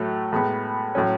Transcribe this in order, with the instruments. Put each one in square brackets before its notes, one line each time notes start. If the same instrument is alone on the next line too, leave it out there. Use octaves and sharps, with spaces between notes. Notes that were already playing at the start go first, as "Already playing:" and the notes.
Already playing: [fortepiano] A2 F#3 A3
A2 G#3 B3
A2 F#3 C#4